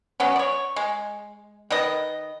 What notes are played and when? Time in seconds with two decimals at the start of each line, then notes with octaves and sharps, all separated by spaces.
0.20 F#3 B3 C#4
0.36 C#5 D5
0.76 G#3
1.70 D#3 B4 D#5